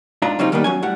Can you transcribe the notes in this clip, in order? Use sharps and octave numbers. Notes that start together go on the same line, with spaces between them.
G#2 D4 F4 A#5
C#3 F#3 G3 C4 D#4 F4
D#3 G3 A#3 B3 D4
F#3 C#4 G#5
A2 G3 F#5